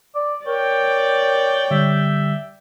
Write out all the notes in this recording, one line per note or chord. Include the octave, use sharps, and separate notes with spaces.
D5
A#4 C#5 D5 G5
D3 G3 E5